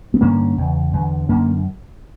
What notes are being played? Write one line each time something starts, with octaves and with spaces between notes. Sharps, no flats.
B3
G2 D3 A#3 C#4
E2 C#3
E2 D3
F#2 D3 A#3 C#4